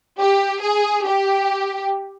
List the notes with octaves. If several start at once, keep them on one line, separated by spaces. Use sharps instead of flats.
G4
G#4
G4